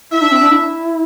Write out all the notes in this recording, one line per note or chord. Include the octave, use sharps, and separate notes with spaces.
E4 E5
D4
C4
D4
E4